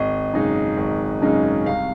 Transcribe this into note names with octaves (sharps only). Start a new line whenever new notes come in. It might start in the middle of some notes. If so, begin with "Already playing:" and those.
Already playing: G#1 D#5
F#2 C#3 G#3 D#4
G#1
F#2 C#3 G#3 D#4
C2 F5